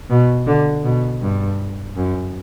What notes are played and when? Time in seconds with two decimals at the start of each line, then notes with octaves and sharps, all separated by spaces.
0.10 B2
0.47 D3
0.84 B2
1.22 G2
1.96 F#2